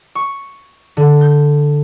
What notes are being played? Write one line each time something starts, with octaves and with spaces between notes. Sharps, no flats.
C#6
D3
G6